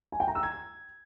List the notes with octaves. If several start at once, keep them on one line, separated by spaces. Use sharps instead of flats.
G#5
G5
A#5
E6
G#6